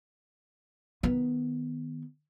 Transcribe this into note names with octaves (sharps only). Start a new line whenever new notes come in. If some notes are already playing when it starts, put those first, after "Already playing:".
D#3 B3